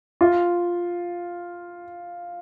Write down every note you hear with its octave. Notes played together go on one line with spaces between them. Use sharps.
F4